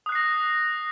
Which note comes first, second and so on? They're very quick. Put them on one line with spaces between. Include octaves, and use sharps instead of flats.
D#6 F#6 C7 A#6